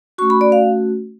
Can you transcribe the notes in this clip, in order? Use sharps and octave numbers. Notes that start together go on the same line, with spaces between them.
A3 C#4 F#4 C#6
B5
D5
F5